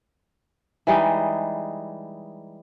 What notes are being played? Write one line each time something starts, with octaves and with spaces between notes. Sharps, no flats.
E3 G3 G#3 D#4